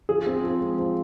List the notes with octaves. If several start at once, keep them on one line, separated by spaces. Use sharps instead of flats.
F3 G#4
C4
F3
G#3
F3